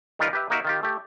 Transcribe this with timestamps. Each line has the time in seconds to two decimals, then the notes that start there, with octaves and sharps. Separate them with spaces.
0.19 D#3 G3 D#4 F4 A#4 B4
0.33 G4 B4 E5
0.50 A#3 D#4 F#4 A#4 E5 F#5
0.65 D#3 F4 G4
0.83 A3 G4